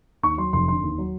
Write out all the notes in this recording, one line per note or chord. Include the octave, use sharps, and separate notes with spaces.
D#2 C#6
F#3 C6
F1 C6
D3 C6
D#2
F#3